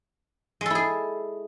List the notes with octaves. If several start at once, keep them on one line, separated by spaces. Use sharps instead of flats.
G#3 E4 G#4 A4